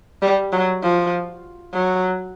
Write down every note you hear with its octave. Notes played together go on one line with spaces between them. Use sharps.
G3
F#3
F3
F#3